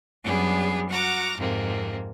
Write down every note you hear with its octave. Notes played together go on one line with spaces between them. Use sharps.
F#2 G3 B3 D4 G#4
F#4 F#5 A#5 D6 F6
F2 G#2 C3 A#3